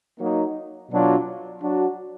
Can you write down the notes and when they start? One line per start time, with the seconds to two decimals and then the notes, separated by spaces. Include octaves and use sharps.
0.19 F#3 A#3 D#4
0.90 B2 F#3 D4 F4
1.62 F#3 D4 F#4